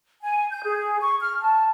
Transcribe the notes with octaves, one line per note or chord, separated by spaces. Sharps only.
G#5
G6
G#4
C#6
F6
A5